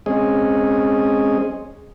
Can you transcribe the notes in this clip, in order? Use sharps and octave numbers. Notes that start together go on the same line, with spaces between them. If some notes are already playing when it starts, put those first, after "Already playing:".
G#3 C4 C#4 G#4 D#5